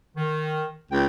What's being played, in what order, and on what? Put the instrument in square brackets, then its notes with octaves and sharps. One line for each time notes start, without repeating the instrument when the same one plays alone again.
[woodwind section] D#3
[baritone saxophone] C#2 [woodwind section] G5